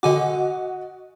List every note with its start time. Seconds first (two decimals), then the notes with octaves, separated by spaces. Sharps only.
0.03 D3 F#4 D#5 G#5 D6